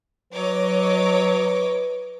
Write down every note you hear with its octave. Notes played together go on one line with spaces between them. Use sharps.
F#3 B4 C#5 D#5 D6